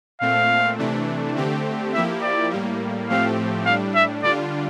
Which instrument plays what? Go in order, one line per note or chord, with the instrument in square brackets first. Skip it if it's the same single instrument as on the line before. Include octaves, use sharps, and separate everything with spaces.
[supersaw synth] A#2 A3 C4 [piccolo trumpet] F5
[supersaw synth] C3 E3 A3 D4
D3 A3 C4 G4
[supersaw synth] F3 A#3 E4 G4 [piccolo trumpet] E5
[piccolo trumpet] D5
[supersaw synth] A2 G3 A#3
[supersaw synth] A2 F3 A3 C4 G4 [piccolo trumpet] F5
[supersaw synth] A2 G3 D4 [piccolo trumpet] F5
[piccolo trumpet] E5
[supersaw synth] D3 G3 D4 F4 [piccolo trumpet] D5